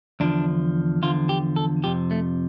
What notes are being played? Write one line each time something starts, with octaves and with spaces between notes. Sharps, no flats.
E2 D3 F3 D4
E2 D3 F3 F4
G4
A4
F2 C3 F3 G4
A3